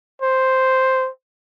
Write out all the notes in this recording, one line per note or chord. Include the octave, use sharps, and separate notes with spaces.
C5